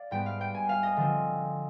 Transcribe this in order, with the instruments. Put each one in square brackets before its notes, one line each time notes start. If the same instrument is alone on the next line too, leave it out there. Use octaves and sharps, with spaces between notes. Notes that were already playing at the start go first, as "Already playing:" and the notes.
Already playing: [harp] D5 F5
G#2 G3 B3 G5
F5
G5
G#5
F5
D#5
D3 F3 C4